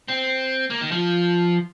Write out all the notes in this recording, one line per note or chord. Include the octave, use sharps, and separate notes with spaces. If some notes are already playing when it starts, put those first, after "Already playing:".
C4
A#3
D#3
F3